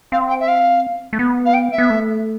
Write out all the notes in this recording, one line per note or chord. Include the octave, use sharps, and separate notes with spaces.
C4 F5
G5
E5
F5
A3
B3
F5
G5
E5
B3
A3